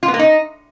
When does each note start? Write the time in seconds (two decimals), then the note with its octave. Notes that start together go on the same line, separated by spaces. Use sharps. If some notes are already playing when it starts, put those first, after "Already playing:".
0.03 F4
0.08 B3
0.14 A#3
0.19 D#4